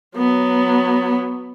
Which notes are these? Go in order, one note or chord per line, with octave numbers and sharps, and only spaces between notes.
F#3 B3